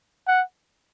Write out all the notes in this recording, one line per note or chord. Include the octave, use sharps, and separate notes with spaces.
F#5